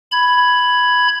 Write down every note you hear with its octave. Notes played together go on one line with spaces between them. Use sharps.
B5 G#6